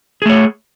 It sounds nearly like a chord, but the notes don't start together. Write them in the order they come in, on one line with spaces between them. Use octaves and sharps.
G#4 A3 C#5